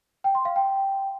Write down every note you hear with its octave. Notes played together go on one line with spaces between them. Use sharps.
G5
C6
F5
G5